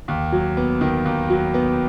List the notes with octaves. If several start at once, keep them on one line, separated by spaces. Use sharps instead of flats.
D#2
F#3
B3
D#3
D#2
F#3
B3